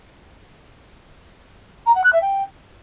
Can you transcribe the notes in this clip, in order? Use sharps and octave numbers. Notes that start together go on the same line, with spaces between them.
A#5
F#5
F#6
E5
G5